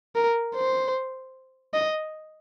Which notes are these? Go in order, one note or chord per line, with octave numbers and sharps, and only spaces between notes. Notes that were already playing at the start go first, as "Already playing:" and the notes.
A#4
C5
D#5